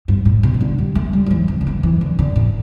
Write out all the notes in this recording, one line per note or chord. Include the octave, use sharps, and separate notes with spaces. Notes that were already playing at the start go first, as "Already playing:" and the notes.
G2
A2
B2
B2
D3
G3
A3
G3
G3
E3
D3
D3
E3
E3
D3
D3
A2